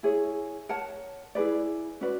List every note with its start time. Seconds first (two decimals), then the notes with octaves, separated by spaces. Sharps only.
0.03 E4 G#4 C#5
0.69 A#4 C#5 F#5 A5
1.35 E4 G#4 B4 D5
2.01 C#4 F#4 B4 D5